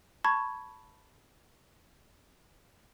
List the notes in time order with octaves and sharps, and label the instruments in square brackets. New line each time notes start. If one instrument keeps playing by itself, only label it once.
[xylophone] A5 B5 C#6 G#6